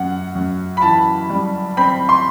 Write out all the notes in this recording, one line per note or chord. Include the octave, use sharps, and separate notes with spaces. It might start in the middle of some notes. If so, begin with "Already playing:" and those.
Already playing: F#2 F#5
F#2
B5
E3 A5
G3
C4 B5
C6